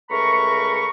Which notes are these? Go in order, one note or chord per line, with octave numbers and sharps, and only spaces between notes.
C#2 A3 A#4 A#5 B5 C#6